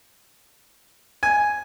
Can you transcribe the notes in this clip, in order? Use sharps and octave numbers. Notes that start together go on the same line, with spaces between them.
G#5